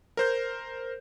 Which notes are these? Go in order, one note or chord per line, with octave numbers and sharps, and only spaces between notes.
A#4 C5 G6